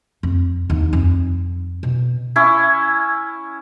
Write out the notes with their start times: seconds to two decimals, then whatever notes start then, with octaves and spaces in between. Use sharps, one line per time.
0.23 F2
0.70 D#2 D#4
0.93 F2
1.83 B2
2.36 C#4 E4